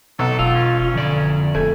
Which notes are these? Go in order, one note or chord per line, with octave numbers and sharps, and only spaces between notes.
B1 A4
E1 F4 E6
C#4
F2 D3 D5
D#1 A3 G#5